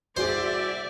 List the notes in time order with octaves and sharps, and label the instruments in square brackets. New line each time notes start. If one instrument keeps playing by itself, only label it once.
[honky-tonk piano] C2 F#4 G#4 [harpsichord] C5 [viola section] D5 E5